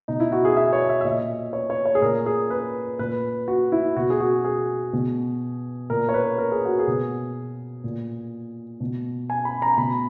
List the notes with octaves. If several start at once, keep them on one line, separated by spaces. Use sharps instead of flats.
B2 D#4
E4
F#4
G#4
E5
C#5
E5
E5
A#2 D#5
C#5
C#5
C#5
G#4
A#2 A#4
G#4
B4
A#2 B4
F#4
E4
B2 F#4
G#4
F#4
G#4
B2
A#2 A#4
C#5
B4
A#4
G#4
F#4
G#4
B2
A#2
B2
G#5
B5
A#5
B2 B5